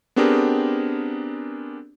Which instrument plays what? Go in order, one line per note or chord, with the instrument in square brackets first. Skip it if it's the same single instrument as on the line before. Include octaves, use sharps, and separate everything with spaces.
[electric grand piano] B3 C4 D4 G4 G#4 A#4